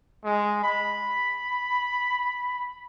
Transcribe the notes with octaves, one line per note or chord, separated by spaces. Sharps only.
G#3
B5